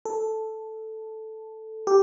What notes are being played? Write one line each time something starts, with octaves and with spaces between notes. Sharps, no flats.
A4
G4